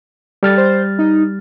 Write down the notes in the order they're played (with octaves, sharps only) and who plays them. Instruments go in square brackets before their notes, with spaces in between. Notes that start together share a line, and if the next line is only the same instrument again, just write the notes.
[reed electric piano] G3 F6 A6 [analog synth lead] A4
[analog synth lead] C5
D#4